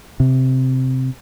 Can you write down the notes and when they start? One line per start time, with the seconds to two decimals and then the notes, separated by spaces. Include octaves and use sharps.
0.20 C3